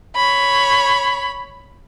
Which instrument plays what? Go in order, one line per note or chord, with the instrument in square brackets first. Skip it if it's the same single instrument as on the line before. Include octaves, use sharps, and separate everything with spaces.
[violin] C#5 B5